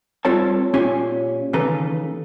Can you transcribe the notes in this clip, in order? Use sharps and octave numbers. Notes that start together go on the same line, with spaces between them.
G2 C4 F4 A4 C#5 A5
A#2 C#4 F4 G4 C#5 G#5
D#2 C#3 E3 A4 B4 A#5